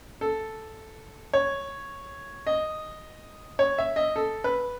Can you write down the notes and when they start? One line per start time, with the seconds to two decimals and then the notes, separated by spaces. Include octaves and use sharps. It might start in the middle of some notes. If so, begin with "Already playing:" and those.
0.21 A4
1.33 C#5
2.47 D#5
3.59 C#5
3.78 E5
3.96 D#5
4.16 A4
4.44 B4